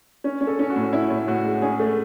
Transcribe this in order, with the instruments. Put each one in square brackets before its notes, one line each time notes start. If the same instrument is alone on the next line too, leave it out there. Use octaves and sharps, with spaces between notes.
[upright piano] C#4
C#4
A4
C#4
F#4
A2
C#4 E4
A2
A2 F#4
G#3
C#4 G#4
A3